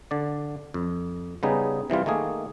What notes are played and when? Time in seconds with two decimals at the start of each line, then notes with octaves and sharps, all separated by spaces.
0.11 D3 D5
0.74 F2
1.43 C#3 G3 B3 D#4 G#4
1.90 C3 E3 G3 F4
2.06 D#3 A3 A#3 G#4